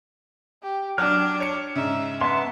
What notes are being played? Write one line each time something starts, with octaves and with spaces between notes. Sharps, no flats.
G4
F#3 D4 F6
C#5 C#7
G#2 C#3 E5
B3 E5 A5 C6